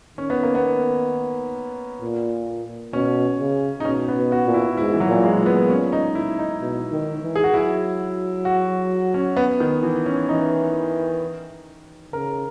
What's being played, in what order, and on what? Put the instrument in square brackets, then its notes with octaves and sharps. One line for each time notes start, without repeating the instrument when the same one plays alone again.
[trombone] D#3 [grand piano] C#4
[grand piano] B3
A#3
B3
[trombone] A#2
[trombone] B2 [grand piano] C#4
[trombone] C#3
[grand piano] D#4
[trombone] B2 [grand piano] C#4
[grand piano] B3
[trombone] B2
[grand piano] F#4
[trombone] A#2
[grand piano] E4
[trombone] G#2 [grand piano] E4
[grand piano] E3
F#3
[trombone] A#2
[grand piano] G#3
[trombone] A#2
[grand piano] B3
C#4
D#4
E4
D#4
[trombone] B2
D#3
E3
[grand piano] G#4
F#4
[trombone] F#3 [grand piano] E4
[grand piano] F#4
C#4
B3
D#3
E3
C#4
[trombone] E3 [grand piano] D#4
[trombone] C#3 [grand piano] A#4